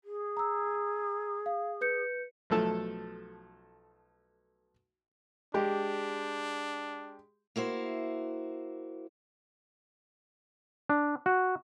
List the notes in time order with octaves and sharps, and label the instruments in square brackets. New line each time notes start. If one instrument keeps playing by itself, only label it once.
[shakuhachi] G#4
[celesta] A#5 E6
F5
B4 G6 C#7
[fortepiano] B1 F3 A3 A4 A5
[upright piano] G#3 G4 [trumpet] D4
[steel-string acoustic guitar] A#3 E4 F#4 C5
[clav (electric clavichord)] D4
F#4